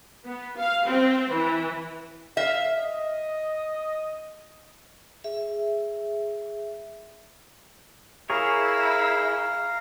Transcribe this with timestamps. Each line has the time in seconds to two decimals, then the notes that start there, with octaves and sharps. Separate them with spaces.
0.25 B3
0.57 F5
0.87 C4
1.31 E3
2.37 E5 F5
2.78 D#5
5.24 G#4 E5
8.30 E4 G#4 A#4 C#5 F5 A#5